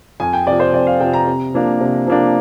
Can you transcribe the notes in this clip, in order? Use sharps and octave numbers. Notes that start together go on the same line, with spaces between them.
F2 G#5
G5
C3 F3 D5
C5
F2 D5
F5
C3 F3 G5
A#5
C3
F3 A#3 D4
C3
F3 A#3 D4